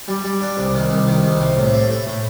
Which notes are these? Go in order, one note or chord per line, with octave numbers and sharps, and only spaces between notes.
G3
G3
D4
C2
D#3
C2
D#3
C2
C3
A2
A3
A3
A2